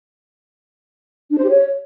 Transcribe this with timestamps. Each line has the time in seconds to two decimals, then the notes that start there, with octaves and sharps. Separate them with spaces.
1.31 D4
1.37 C5
1.43 G4
1.49 C#5